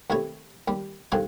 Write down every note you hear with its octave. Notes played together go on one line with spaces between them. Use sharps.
D#2 C3 A3 E4 C#5
D#2 G3
G2 D3 D#3 C4 F4 G#5